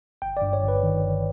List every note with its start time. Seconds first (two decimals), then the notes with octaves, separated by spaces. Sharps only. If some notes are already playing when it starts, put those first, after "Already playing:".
0.22 G1 G5
0.37 D5
0.42 G2
0.53 C#5
0.63 G1
0.68 B4
0.83 D#3
1.04 G1